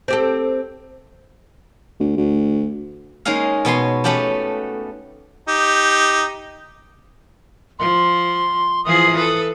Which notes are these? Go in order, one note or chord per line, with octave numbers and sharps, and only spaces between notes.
C4 G4 A4
D2
D2
G#3 A#3 C#4 D#4 G#4 F5
B2 B3 C#5 C6
A3 B3 C#4 F#4 G4 A5
D#4 G4
F3 C6
E3 F3 G#4 D#6
A4 B4